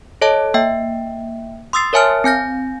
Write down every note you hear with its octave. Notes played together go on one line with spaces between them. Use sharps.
A4 C#5 D#5 A5
A#3 E5 G5
C6 D#6 E6 A6 C7
A#4 C#5 E5 G#5 A5 F6
C4 G#5 G6 A#6